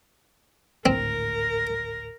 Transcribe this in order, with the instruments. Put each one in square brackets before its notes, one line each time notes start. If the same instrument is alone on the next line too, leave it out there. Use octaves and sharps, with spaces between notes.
[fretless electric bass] G#1 D2 A2 [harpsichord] C4 [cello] A#4